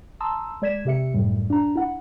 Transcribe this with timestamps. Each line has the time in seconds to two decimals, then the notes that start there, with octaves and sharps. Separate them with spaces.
0.20 A5 A#5 C6 D#6 E6
0.62 G#3 D5 G#6 B6 E7
0.85 C3 G4 E5 C#7
1.14 F#2 A2 G3
1.50 D4 A#5
1.76 E4 F#5